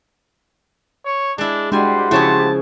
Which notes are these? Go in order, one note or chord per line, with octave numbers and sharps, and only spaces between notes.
C#5
G#3 D4 E4
G3 G#3 D4 F#4 G4 C5 G#5 C6
C#3 F3 E4 G#4 C#5 A5